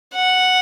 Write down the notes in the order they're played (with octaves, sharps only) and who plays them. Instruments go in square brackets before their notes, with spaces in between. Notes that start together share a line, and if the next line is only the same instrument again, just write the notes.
[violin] F#5